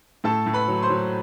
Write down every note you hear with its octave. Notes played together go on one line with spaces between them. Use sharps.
A2 A4 A5
A2
B4 B5
F#3
C5 C6
F#3